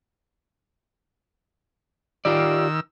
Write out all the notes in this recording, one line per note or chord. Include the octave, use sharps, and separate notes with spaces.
D#3 F4 G4 D5 E6